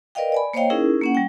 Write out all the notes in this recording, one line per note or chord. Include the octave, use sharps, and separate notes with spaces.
A#4 B4 D5 D#5 F5 G5
D5 G#5 B5
A#3 C5 C#5 D#5 F5 G5
C#4 D#4 E4 G#4 A#4
A#3 C#4 F#5
G3 G5